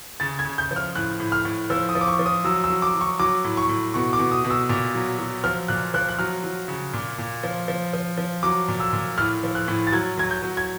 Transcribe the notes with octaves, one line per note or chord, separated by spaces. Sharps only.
C#3 A6
G#6
C#3
G6
F3
F6
A2 F#6
A2
F6
A2
F3 E6
D#6
F3
D6
C#6
F3
D#6
F#3 E6
E6
F#3
D6
F#3
C#6
F#3 D6
A2
C#6
A2
B2 C#6
D6
B2
D#6
B2
E6
A#2
F#3
F#3
F3 F6
A#2 F#6
F3 F#6
F#6
F#3 F6
F#3
C#3
A#2
A#2
F3
F3
F3
F3
F#3 D6
A#2
E6
A#2
A2 F6
F3
F#6
A2
A6
F#3 G#6
F#3 G#6
G6
F#3
G#6